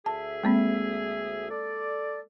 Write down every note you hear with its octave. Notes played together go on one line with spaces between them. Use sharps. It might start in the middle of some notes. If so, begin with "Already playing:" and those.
D2 G#4 E5 A5
G#3 A#3 C4
A4 D5